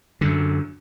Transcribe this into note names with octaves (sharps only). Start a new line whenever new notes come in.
F#2 D3